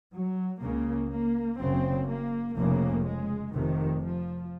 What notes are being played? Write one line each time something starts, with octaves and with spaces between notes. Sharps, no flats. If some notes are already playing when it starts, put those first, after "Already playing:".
F#3
C#2 C#3 A#3
A#3
F#1 F#2 C#3 C4
A#3
F1 F2 C#3 A#3
G#3
F1 F2 C3 D#3
F3